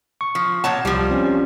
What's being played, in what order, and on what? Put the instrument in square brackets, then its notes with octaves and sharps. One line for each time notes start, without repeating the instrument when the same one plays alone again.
[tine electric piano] C#6
[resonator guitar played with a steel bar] F3
[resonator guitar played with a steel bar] A#2 C#5 A5 [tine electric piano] F#5
[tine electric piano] C2 [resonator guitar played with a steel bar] F3 G3
[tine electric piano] C4 C#4